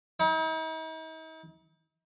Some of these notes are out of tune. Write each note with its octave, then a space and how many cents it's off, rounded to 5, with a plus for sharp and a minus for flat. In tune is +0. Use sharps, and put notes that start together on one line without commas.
D#4 +45